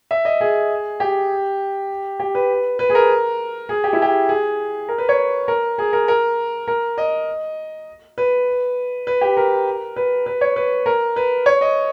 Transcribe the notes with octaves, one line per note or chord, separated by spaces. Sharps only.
E5
D#5
G#4
G4
G4
B4
B4
G#4
A#4
G#4
G4
E4
G4
G#4
A#4
B4
C#5
A#4
G#4
A#4
A#4
A#4
D#5
B4
B4
G4
A#4
B4
B4
C#5
B4
A#4
B4
C#5
D#5